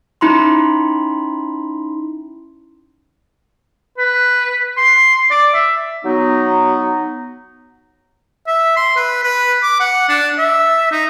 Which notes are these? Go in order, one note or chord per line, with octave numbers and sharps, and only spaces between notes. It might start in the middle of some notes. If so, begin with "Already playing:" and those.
C#4 D#4 E4 B5 C6
B4
C6
D5
E5
F#3 B3 D#4
E5
C6
B4
B4
D6
F#5
D4
E5
D#4